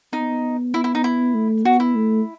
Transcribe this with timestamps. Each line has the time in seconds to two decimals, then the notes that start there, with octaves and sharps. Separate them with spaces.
0.13 B3 D#4
0.74 E4
0.84 E4
0.95 D#4
1.04 E4
1.35 A3
1.65 B3 F#4
1.80 E4
1.95 A3